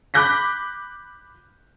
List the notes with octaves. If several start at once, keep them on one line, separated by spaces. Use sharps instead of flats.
B5 D6 F#6 G6 A#6 B6